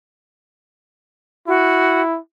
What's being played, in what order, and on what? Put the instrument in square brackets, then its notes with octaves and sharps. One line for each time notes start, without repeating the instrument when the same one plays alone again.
[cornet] E4 [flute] F#4